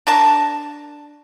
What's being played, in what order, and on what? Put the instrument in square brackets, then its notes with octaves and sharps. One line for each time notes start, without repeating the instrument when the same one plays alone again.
[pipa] D4 A#4 A5